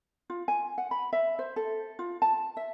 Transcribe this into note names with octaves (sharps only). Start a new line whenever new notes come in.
F4
G#5
F#5
B5
E5
C5
A4
F4
A5
E5